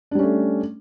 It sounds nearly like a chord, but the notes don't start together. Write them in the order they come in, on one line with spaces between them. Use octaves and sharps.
D4 G3 C#4 A3